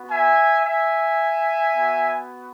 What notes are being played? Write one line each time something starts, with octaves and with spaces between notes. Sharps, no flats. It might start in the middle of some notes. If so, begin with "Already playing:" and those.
Already playing: B3 F#4
E5 G#5
E5 G#5
B3 F#4